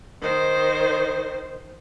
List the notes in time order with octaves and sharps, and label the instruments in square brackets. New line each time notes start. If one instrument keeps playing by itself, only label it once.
[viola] D#3 C5